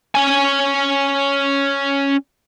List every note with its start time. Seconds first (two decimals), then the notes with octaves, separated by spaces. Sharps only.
0.15 C#4 G#5